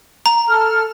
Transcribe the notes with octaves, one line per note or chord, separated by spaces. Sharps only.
A#5
A4 F6